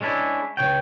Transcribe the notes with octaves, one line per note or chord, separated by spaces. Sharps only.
G#3 C#4 D4 E4
C#2 D#3 C#5 G5